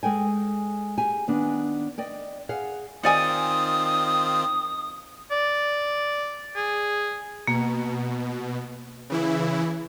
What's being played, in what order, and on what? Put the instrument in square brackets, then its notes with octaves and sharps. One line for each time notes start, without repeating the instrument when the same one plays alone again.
[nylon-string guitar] G#3 A4 G5 G#5
G4 G#4 G#5
D#3 B3 D4
D5 D#5 G5
G#4 F5 F#5
[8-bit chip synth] D#3 C4 F4 [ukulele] D#4 D5 G#5 [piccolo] D#6
[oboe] D5
G#4
[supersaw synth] B2 [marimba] A#3
[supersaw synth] C#3 E3 E4